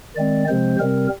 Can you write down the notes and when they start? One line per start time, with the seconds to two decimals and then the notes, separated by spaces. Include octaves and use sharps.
0.16 D#3 G#3 C4 D5
0.48 C3 F3 G#3 C4 C5
0.80 C3 G3 C4 A#4